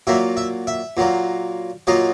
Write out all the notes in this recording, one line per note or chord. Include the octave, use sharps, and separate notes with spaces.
A#2 F#3 A#3 E5
E5
E5
A#2 F#3 A#3
A#2 F#3 A#3 D#5